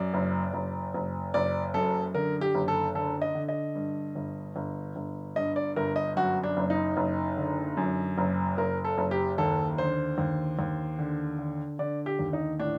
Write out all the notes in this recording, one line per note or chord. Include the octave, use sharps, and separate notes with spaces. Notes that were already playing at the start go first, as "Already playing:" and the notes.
Already playing: F#2 D5
F#1
F#1
F#1
F#1 D5
F#2 A4
D3 A#4
G4
F#1
A4
D3 A4
D#5
D3
D#5
G2
G1
G1
G1
G2 D#5
D5
G1 A#4
D#5
F#2 F#4
D4
F#1
D#4
F#1
D3
F#2
F#1
F#1 A#4
A4
F#1
G4
D#2 A4
D3 C5
D#2
D#2
D3
D3
D3 D5
G4
D#2
D#4
A2 D4